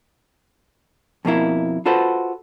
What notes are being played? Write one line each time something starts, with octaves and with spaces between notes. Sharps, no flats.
F2 B2 A#3 E4
F4 F#4 A4 B4 C5